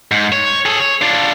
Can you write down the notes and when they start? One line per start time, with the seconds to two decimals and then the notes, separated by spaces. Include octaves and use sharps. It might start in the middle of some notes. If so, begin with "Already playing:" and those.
0.11 G#2
0.32 C#5
0.66 G#4 A4
0.80 C#5
1.01 D4 F4